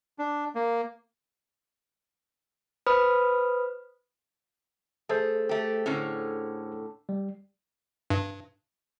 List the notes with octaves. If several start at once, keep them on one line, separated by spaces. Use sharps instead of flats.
D4
A#3
B4 C5 B5 D#6 F6
A3 G#4 A4 C5
A3 G4
A2 D3 C#4
G3
G2